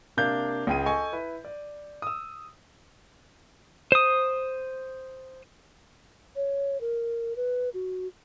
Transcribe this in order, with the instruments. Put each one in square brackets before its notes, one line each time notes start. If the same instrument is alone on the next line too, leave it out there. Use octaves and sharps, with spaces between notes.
[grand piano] C3 A#3 D4 F5 G6 G#6
C#2 G#4 G5 G#5 D#7
A4 D#5 G#5 C#6
E4 B4
D5
D#6 E6
[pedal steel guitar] C5 D#6
[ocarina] C#5
A#4
B4
F#4